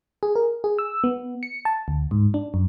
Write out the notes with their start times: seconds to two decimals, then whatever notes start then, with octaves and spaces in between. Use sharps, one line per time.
0.23 G#4
0.36 A#4
0.64 G#4
0.79 E6
1.04 B3
1.43 C#7
1.65 A5
1.88 D2
2.11 G#2
2.34 D4
2.54 F#2